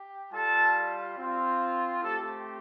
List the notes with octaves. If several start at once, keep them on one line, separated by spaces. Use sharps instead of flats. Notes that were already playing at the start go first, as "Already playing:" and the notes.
Already playing: G4
G3 F4 A4 A5
C4 F4
A3 C4 G4 A4